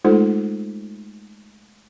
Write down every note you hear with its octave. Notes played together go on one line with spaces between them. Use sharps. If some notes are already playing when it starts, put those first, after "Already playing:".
G#3 A3 D#4 F4 A4 C5